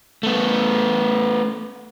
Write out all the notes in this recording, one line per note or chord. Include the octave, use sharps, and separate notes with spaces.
A3 B3